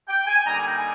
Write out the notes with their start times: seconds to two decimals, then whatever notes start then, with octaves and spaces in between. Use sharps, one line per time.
0.08 G5
0.27 G#5
0.45 D3 G3 A#3 D#4 A#5
0.55 G#5
0.66 G5
0.76 G#5